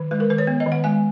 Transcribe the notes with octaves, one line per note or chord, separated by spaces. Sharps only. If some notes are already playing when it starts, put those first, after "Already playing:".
Already playing: D#3
G#3 B4
A#4
D#3 B4
C#5
B3
D#5
D#3
F#5
G#3 G#5